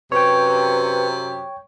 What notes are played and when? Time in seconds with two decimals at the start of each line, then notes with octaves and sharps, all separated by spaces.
0.12 F#2 C3 B4 C#5 G5